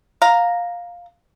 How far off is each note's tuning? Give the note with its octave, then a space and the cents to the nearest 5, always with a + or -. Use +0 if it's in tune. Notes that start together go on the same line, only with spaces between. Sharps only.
F5 +10 A#5 +0